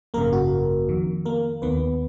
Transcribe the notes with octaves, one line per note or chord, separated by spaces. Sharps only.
G#1 F#2 C#3 A#3 A#4
F#4
F2 D#3
A#3 A#4
D#2 D#3 B3 B4